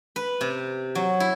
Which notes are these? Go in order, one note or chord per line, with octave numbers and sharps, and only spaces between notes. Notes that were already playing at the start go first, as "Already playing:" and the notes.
B4
C3
F#3
E4